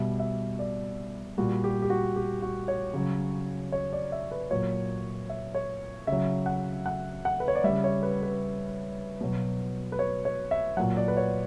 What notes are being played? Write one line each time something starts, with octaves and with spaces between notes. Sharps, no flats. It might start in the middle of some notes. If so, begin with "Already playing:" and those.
Already playing: B2 G3 E5
E5
D5
A#2 G3 F#4
G4
G4
F#4
G4
F#4
C#5
C#3 F#3
C#5
D5
E5
B4
A#2 F#3 C#5
E5
C#5
C#3 F#3 E5
F#5
F#5
F#5
B4
C#5
D5
C#3 G3 E5
C#5
B4
B4
B2 F#3
B4
C#5
C#5
E5
A#2 F#3 F#5
D5
B4
C#5